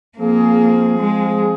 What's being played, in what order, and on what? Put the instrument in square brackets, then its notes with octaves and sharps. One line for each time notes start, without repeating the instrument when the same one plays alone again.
[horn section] F3 C4 F4 G#4 [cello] A#3
[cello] G#3